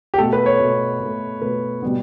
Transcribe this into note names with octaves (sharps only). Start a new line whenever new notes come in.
G4
B2 A3 A4
B4
C#5
B2 A3
B2 A3
B2 A3 B4
B2 G3 B3